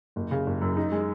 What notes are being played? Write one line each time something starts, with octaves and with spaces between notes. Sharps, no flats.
F#1
C#3
F#1
F#2
D#4
G#3